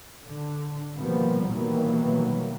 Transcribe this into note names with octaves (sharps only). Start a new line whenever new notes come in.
D3
B2 D#3 F3 G3 A#3 B3
B2 D#3 E3 F#3 G3 A#3